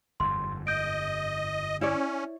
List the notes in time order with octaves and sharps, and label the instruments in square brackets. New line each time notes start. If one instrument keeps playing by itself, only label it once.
[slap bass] G1 F2 G#2 [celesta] C6
[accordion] D#5 [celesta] G6 D7
[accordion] C#4 [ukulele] E4 C#5 D5